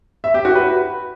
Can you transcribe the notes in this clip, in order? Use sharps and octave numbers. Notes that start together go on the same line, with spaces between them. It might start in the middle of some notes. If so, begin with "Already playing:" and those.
E5
G4
F#4
B4